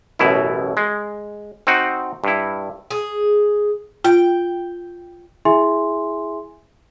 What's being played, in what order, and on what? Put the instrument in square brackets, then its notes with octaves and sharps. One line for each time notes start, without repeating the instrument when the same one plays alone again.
[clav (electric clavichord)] A1 F#2 B2 E4
G#3
C4 D#4 F#4
G2 E4
[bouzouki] G#4
[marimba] F4 [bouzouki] G5
[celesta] E4 G#4 E5 G#5 C6